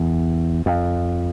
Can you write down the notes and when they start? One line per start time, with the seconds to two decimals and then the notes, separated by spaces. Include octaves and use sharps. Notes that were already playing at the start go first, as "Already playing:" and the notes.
Already playing: E2
0.66 F2